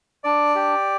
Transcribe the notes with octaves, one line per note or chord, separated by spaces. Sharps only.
D4 D5
G4